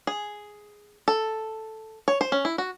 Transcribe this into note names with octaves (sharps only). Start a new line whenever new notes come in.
G#4
A4
C#5
C5
C#4
E4
F#4